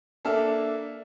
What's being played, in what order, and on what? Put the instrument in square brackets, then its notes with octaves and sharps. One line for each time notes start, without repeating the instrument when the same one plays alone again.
[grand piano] A#3 D4 A4 E5 F6